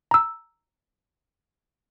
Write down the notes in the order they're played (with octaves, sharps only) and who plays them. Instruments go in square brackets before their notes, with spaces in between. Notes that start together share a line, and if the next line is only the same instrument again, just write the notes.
[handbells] A#5 E6